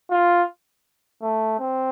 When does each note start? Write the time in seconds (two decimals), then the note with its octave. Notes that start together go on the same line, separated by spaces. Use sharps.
0.11 F4
1.22 A3
1.59 C4